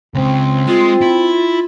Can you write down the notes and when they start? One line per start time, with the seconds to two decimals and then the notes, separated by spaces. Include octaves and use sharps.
0.15 C#2 C#3 C4
0.68 G#3 F4
1.01 E4